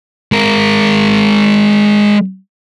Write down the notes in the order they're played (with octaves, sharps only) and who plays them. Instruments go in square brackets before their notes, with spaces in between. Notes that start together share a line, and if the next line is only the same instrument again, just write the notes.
[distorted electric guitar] G#3 A#4